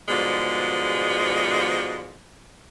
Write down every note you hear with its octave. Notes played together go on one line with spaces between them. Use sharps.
G#2 B2 D3 F3 G3 G#3